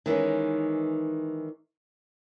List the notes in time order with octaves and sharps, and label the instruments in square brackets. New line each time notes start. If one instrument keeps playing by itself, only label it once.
[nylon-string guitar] D#3 E3 G#3 C#4